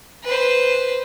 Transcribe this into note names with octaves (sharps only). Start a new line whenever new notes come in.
B4 C5